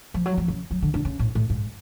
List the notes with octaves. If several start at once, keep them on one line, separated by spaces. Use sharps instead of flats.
F3
F#3
F3
C#3
F#3
D3
D3
C#3
A2
A2
G#2